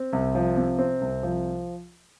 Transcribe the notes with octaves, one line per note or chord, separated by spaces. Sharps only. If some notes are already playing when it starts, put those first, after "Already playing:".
Already playing: C4
C2
F3
C3
C4
C2
F3